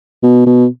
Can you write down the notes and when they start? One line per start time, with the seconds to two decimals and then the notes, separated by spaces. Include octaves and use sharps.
0.23 B2
0.46 B2